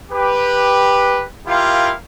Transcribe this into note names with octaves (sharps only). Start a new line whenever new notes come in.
G4 B4
E4 F4 G4 A#4 F5